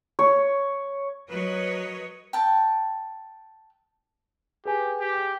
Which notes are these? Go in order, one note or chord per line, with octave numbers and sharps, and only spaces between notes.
C#5
F#3 A#4 B4 C#5 D#5
G5 A5
G4 G#4 B4 G#5
G4